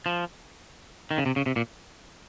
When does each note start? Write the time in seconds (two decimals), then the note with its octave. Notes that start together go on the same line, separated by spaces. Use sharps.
0.06 F3
1.11 D#3
1.18 C#3
1.26 C3
1.36 C#3
1.46 C3
1.56 A#2